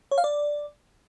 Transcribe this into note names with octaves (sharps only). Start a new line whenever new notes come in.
C#5
F5
D5